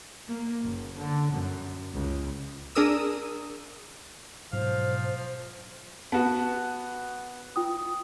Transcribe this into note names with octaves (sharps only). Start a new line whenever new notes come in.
A#3
F#1
D3
F#2
C#2
D4 G#4 A#4 D#6 E6
G#2 B2 F3 F#3 C5 F5
B3 F#4 A5
F4 G5 D#6